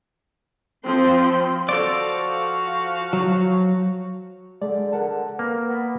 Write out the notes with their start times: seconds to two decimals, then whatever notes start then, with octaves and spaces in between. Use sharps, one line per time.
0.85 F3 C4 C6
1.69 F3 F#4 A4 C5 D5 F5
3.13 F#3
4.62 D3 G#3 G#4 D5
4.92 A#4 F#5 A5
5.39 A#3 A#4 B4
5.70 B3